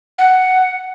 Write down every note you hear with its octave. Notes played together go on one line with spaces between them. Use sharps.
F#5